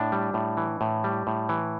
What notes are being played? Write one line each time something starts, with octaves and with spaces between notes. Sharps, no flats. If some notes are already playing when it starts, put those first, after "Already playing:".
Already playing: A2 D4
G3
A2
E3
A2
G3
A2
E3